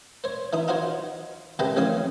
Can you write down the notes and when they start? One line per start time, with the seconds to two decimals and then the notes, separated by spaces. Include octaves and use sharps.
0.24 C5 C#5
0.53 E3 D#4 D#6
0.68 D#4 F4 F#4 C5 C#5
1.59 C#2 C3 G#3 B4 D#5 G5
1.76 A1 F2 C#3 C#5 F5 D#6